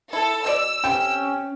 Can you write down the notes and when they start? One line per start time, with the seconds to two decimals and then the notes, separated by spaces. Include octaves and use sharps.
0.13 E4 A4
0.44 B2 C4 D5 E6
0.84 C3 C#4 G4 A4 G5